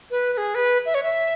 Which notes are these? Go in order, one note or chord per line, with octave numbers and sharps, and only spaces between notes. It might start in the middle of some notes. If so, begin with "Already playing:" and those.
B4
B4
G#4
B4
E5
C#5
E5